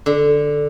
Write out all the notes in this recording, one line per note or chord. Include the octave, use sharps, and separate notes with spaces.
D3